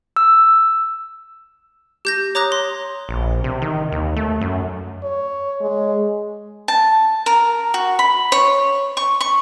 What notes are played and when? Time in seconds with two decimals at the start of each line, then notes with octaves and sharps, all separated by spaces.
0.16 E6
2.05 G4 G6 A#6
2.35 C#5 A#5 D6 D#6 F#6 A#6
2.52 C6
3.09 A#1
3.44 C3
3.62 D#3
3.92 D#2
4.16 A3
4.41 F#2
5.03 C#5
5.61 G#3
6.68 A5
7.26 A#4
7.74 F#4
7.99 B5
8.32 C#5
8.97 C#6
9.21 C#6